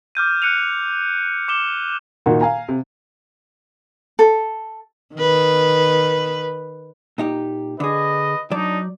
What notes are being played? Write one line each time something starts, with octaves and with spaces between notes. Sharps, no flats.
D6 F6 G6 D#7
F#6 C#7 D#7 F7
D6 E7 G7
A#2 D#3 D#4 F#4
F5 G#5 A#5
C3
A4
D#3 B4
A#2 D#4 G4
D3 G#4 B4 D#5
F#3 D4 D#4 D5